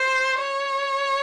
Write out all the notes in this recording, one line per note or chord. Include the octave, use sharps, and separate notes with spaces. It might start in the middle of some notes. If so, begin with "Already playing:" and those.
Already playing: C5
C#5